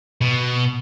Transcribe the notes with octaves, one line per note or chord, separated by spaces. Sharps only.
B2